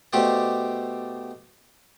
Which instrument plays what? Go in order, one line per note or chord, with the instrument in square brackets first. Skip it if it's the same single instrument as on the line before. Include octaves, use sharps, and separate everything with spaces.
[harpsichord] B2 A3 G4 C5 D5